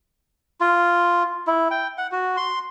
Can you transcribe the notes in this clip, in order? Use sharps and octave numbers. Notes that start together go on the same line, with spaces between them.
F4
E4
G5
F#5
F#4
C6